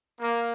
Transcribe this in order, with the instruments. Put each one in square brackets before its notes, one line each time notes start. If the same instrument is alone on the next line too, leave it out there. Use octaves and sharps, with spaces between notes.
[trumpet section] A#3